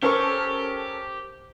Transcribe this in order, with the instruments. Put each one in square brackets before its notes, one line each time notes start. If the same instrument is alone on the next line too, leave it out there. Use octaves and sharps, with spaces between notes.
[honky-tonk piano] C#4 A4 A#4 [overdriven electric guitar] G4 [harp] C5 C#6